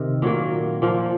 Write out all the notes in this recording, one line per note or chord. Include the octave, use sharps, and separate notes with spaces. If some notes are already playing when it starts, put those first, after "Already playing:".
Already playing: C3 D#3
A#2 F#3 A#3
A#2 F3 A#3